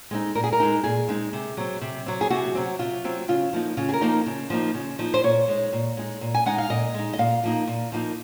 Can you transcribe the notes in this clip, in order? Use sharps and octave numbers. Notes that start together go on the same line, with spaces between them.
G#3 C4 D#4
A#2 A#4
G#4
A#4
G#3 C4 D#4
A#2 G#4
G#3 C4 D#4
C3
F#3 C4
C3
F#3 C4
G#4
C3 F#4
F#3 C4
C3 F4
F#3 C4
C#3 F4
F3 A#3 D#4
C#3 F4
G#4
A#4
F3 A#3 D#4
C#3
F3 A#3 D#4
C#3
F3 A#3 D#4
C5
A#2 C#5
G#3 D#4
A#2
G#3 D#4
A#2
G#5
G#3 D#4 F#5
F5
A#2 D#5
G#3 D#4
D#5
A#2 F5
F3 A#3 D#4
A#2
F3 A#3 D#4